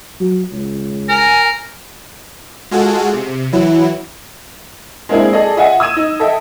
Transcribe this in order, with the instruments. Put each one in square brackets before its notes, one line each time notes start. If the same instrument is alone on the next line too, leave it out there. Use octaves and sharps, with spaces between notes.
[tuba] F#3
C#2
[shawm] A#4 [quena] G#5
[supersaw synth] G#3 F4 F#4 G#4 A4
C3
E3 F#3 E4
[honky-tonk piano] G#3 A#3 C4 D4 E4 G#4
G#4 A4 D5 D#5
F4 D#5 E5 F#5 G#5
D#6 E6 G#6 D#7 E7
D#4
A4 D#5 E5 G5